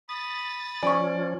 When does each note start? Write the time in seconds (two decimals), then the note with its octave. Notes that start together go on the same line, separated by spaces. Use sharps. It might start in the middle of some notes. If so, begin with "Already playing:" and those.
0.09 B5 D#6 A6
0.83 F3 C#4 D5 G#5 C#6